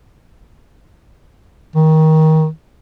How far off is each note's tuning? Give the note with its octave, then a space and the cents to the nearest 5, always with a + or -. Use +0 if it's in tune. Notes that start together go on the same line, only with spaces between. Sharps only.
D#3 +20